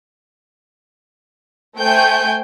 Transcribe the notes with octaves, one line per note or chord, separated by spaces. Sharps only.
A3 C5 G5 G#5 G6